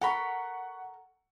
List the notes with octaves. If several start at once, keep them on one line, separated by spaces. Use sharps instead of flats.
A4 A#4 F#5 B5 C#6